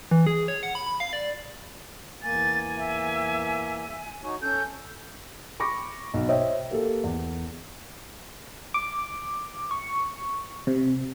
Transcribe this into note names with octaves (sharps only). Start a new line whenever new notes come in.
E3
G#4
C#5
F#5
B5
B5
F5
D5
E2 A#3 G#5 A6
E5
D#4 F#4 C#5
C#4 A4 G6
B5 C#6 D6 A#6
B1
C5 C#5 D#5 E5 G5
A#3 G4 A4
E2
D6
C#6
C3